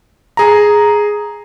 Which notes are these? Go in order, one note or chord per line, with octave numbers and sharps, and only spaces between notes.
G#4 A#5